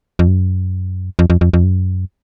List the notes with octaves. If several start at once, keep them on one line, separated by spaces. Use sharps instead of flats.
F2
F#2
F2
F2
F2
F2
F#2